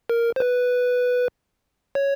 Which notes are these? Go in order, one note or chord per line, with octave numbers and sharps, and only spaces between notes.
A#4
C5
B4
C#5